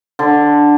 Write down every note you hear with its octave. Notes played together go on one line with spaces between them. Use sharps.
D3